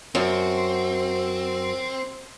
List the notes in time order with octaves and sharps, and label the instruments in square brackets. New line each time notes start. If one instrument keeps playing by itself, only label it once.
[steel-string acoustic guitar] F#2 F#4 [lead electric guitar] C4